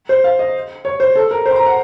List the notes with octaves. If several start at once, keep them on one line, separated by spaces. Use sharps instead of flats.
C5
F5
D#5
C#5
C5
A4
A#4
C5
C6
A#5
F#5